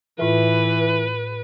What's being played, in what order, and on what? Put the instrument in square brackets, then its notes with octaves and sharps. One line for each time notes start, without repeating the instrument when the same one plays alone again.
[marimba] A2 F4 E5 [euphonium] E3 [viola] B4